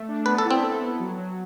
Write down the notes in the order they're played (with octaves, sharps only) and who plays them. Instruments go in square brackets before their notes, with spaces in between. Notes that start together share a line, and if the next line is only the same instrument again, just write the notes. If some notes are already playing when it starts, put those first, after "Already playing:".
Already playing: [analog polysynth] A3
D4
[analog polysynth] B3 [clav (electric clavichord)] B4
[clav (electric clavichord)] A4
[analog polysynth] E4
[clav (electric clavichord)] C4
[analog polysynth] A4
B3
F#3
F#3